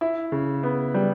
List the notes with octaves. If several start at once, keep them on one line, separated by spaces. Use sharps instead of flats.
E4
C#3
B3
G3